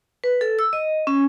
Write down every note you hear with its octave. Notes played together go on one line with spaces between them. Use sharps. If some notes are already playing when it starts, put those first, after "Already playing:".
B4
A4
E6
D#5
C#4